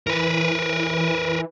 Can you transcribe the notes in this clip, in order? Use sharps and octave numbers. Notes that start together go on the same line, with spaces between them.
E3 A#4 B4